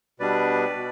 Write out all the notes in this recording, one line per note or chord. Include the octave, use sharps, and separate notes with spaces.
B2 G3 B3 D4 B4 D5
B2